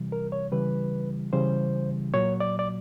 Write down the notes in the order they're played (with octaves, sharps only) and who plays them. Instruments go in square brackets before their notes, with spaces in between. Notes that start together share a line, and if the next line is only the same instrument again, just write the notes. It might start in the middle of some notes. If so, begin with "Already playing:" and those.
Already playing: [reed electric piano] C3 E3 G3
A#4
C#5
C#3 E3 G3 B4
C#3 E3 G3 C5
A#2 F#3 C#5
D5
D5